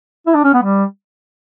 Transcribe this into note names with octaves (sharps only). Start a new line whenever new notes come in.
E4
D4
C#4
B3
G3